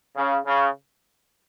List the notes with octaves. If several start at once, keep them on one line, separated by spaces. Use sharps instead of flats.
C#3
C#3